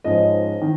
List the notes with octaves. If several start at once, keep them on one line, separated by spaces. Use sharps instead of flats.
G#2 F3 C#4 D#5
D#3